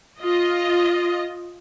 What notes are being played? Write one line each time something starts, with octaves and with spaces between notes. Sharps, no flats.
F4 D#5